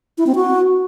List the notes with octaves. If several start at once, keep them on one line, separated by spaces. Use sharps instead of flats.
E4
C4
F#4